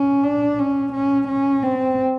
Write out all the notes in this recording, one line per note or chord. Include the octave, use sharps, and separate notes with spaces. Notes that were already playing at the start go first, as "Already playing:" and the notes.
Already playing: C#4
D4
C#4
C#4
C#4
C4